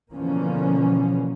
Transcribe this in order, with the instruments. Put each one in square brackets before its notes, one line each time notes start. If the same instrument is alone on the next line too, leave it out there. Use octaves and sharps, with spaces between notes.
[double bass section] B2 D3 E3 F3 A#3 C#4